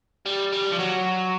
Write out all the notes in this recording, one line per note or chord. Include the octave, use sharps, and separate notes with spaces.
G3
G3
F3
F#3